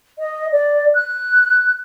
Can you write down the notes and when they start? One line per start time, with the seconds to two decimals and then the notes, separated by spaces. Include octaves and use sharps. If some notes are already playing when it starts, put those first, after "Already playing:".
0.18 D#5
0.52 D5
0.94 F#6